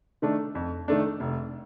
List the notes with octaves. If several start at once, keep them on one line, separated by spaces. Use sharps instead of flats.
D#3 A3 D4
F2
D#3 A3 D4
F1